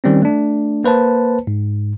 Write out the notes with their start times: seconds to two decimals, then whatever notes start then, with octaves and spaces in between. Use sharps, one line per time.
0.04 D#3 G3 C4 C#4
0.22 A3 D4
0.84 A#3 B4 C5 A5
1.47 G#2